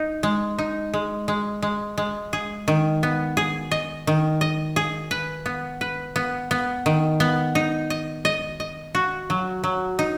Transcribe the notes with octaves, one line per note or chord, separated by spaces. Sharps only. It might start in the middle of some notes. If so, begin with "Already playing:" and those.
Already playing: D#4
G#3
D#4
G#3
G#3
G#3
G#3
G#4
D#3
B3
G#4
D#5
D#3
D#5
G#4
B4
B3
B4
B3
B3
D#3
B3
D#4
D#5
D#5
D#5
F#4
F#3
F#3
D#4